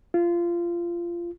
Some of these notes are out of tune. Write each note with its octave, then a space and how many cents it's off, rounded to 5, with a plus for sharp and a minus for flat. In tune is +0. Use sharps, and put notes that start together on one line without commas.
F4 -20